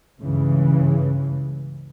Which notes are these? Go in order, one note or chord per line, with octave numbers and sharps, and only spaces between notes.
C#2 G2 C#3 E3